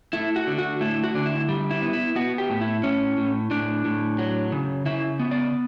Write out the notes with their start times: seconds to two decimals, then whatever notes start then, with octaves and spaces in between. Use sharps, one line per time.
0.13 A3 E4
0.36 F#4
0.47 D3
0.58 F#4
0.81 A3 E4
1.04 F#4
1.14 D3 D4
1.26 E4
1.49 G3
1.71 E4
1.82 B3
1.93 E4
2.16 B3 F#4
2.38 G4
2.50 A2
2.61 E4
2.83 A2 C#4
3.17 A2
3.51 A2 D4
3.85 A2
4.18 F#3
4.52 C#3
4.86 C#3 E4
5.20 B3
5.31 D5